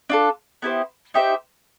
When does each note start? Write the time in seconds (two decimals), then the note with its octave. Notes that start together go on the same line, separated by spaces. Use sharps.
0.10 D4 F4 A4
0.62 B3 E4 G4 C5
1.14 D#4 G4 C5 E5